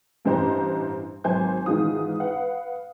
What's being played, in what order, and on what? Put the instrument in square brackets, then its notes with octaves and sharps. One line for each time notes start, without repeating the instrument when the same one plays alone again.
[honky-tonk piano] A1 G2 E3 C5 D#5 A#5
G#1 F#3 C5 G#5 G6
G#2 D#3 E3 G#3 F4 D#6
B4 F5 F#5